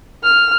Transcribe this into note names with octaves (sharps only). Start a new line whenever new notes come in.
F6